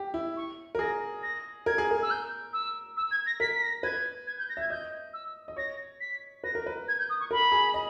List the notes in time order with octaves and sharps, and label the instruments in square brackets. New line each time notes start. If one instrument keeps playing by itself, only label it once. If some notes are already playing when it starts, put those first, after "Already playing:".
Already playing: [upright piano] G4
E4
[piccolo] C#6
[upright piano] A#4
[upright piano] G#4 [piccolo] A#6
[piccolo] A#6
[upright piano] A#4 [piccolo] G#6
[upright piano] G#4
A#4
[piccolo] E6
G6
E6
E6
G#6
A#6
[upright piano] A#4 [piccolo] B6
[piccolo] B6
A#6
[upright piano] B4 [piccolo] G#6
[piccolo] G#6
G6
A#6
[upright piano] E5 [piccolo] G#6
[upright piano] D#5 [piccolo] G6
[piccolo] E6
[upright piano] D#5
[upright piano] C#5 [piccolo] A#6
[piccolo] B6
[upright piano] B4 [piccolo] A#6
[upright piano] A#4
B4
[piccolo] G#6
G6
D#6
C#6
[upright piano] A#4 [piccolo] B5
[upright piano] G#4
D#5